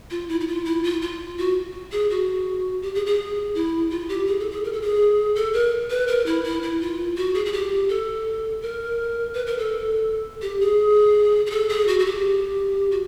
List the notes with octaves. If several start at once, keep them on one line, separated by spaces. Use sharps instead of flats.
F4
E4
E4
F4
E4
F4
F4
F#4
G#4
F#4
G4
G#4
G#4
E4
F4
G4
G#4
A4
G#4
A#4
A4
G#4
A4
A#4
B4
A#4
E4
E4
E4
F4
F#4
G#4
G#4
G4
A4
A#4
B4
A#4
A4
G4
G#4
G#4
A4
G#4
F#4
F#4
G4
F#4